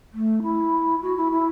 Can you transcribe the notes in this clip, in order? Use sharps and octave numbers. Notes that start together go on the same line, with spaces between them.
A3
E4
F#4
E4
E4